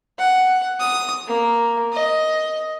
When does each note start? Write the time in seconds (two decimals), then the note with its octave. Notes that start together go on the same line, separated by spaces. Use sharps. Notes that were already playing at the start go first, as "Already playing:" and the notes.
0.18 F#5
0.80 D#6
1.27 A#3
1.93 D#5